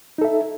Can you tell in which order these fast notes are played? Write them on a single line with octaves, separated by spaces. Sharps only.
D#4 A4 E5